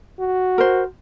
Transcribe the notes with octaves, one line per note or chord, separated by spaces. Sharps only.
F#4
A#4 C5